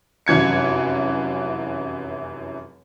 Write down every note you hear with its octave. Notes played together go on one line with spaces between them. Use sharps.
F1 F#2 E3 G#6 C#7